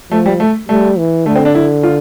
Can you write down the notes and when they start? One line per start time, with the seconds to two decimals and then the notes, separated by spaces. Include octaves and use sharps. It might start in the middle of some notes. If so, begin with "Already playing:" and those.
0.11 F3 A3
0.26 G3
0.40 A3
0.69 G3 A3
0.98 E3
1.26 D3 A3
1.36 C4
1.45 D4
1.55 E4
1.83 F4